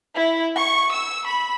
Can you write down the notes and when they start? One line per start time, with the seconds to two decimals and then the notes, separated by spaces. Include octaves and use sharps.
0.16 E4
0.56 C#6
0.90 E6
1.25 B5